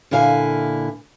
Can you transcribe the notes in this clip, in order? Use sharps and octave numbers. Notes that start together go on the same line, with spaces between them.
A#2 D3 E4 F5 G#5